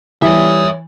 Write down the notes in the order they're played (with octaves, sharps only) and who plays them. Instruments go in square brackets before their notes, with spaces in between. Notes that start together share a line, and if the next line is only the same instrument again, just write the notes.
[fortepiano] E3 [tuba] G3 [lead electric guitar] C#5 E5 [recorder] D#6